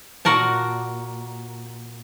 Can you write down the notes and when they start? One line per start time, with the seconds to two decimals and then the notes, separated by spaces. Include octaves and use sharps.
0.25 A#2 F#4 A#4 A5